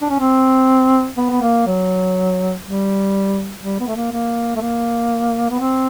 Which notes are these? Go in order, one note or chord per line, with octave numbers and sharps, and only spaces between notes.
D4
C#4
C4
B3
B3
A#3
F#3
G3
G3
B3
A3
A#3
A#3
A3
A#3
B3
C4